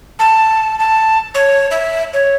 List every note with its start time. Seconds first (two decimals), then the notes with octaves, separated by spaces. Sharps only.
0.19 A5
0.79 A5
1.35 C#5
1.71 E5
2.13 C#5